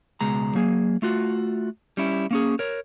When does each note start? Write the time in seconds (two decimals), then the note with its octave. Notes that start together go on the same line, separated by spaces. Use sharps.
0.21 C#2 B2 G#3 A#5
0.55 F#3 A#3 G#4
1.02 A3 F4 F#4
1.97 G3 C#4 E4
2.31 A#3 C#4 G#4
2.59 A#4 C#5